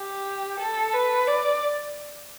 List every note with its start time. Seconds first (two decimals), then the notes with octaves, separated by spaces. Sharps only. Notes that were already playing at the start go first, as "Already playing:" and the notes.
Already playing: G4
0.61 A4
0.94 B4
1.28 D5